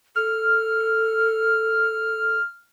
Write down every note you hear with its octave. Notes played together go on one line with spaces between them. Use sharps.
A4 F6